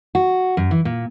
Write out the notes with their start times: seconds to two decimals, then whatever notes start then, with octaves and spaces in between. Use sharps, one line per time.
0.15 F#4
0.57 F#2
0.71 E3
0.85 A#2